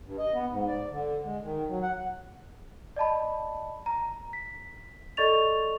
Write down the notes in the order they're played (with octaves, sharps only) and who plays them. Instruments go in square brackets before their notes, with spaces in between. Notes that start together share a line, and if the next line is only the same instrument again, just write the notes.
[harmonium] G2
D#5
B3
G#2
D5
D3
G#3
D#3
F#3
F#5
[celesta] D5 D#5 A5 B5
A#5
B6
A4 D5 D#5 C#6 A6 F7